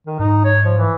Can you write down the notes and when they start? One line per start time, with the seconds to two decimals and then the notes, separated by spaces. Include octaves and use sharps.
0.07 D#3
0.19 G#2 D#4
0.45 C#5
0.64 F3
0.78 E3